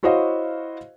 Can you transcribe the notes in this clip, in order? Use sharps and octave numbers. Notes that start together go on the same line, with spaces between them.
E4 F#4 C5 C#5 D#5 F5